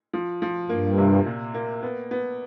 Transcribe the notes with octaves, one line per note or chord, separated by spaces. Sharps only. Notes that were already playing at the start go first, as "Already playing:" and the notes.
F3
F3
G2 A#3
C3
A#2
A#3
B3
B3